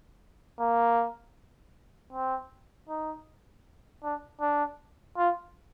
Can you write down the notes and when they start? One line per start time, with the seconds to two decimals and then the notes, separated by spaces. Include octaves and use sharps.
0.60 A#3
2.12 C4
2.89 D#4
4.03 D4
4.41 D4
5.17 F4